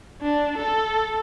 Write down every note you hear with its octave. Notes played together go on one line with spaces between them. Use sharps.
D4
A4